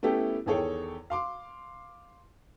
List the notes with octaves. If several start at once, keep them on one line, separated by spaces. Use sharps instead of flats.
A3 B3 C#4 E4 G4 A4
E2 D#3 G#4 A4 C#5 G5
F5 C6 D6